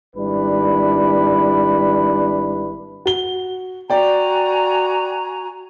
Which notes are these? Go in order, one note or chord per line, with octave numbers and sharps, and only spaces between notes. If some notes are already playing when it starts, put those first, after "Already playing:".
G#1 G3 D4 E4 B4
F#4 G7
F#4 D5 G5 G#5 A#5